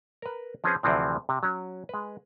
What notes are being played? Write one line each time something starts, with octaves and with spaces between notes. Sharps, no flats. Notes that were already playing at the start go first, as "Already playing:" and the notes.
A#4 B4
F3 C4 C#4 G#4 B4 C5
D2 C3 E3 F3 C4
C3
F#3 C#4
G#3 B4